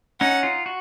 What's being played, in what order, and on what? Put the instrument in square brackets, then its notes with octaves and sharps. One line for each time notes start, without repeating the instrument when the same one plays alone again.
[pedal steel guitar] C#4 D#4 [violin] F#5
[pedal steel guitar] D#4 F4
F#4